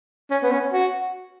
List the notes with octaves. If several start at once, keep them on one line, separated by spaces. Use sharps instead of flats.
C#4
B3
C#4
F#4